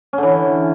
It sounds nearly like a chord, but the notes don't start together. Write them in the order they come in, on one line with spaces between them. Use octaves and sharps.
C#4 D3 E3